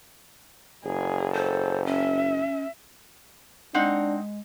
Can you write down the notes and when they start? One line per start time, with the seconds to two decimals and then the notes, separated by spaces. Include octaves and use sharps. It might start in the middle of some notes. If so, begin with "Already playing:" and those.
0.85 F#1 G#4
1.35 A4 C5
1.86 C#4 E5
3.74 G#3 C4 D4 D#4 F#5